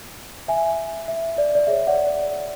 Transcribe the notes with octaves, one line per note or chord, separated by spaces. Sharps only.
E5 G#5
E5
D5
D5
G#4 C#5 E5
D5 F#5
D5